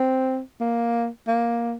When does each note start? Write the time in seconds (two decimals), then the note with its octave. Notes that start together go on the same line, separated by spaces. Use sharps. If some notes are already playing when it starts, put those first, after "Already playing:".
Already playing: C4
0.60 A#3
1.27 A#3